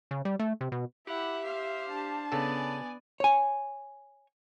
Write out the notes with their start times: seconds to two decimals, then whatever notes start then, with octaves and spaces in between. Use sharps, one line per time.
0.11 C#3
0.25 G3
0.39 A3
0.61 C3
0.72 B2
1.07 E4 G4 E5 F#5
1.45 C5 F5
1.88 D4 A5
2.32 C#3 B3 A4 D5 G#5
3.20 C#5 G#5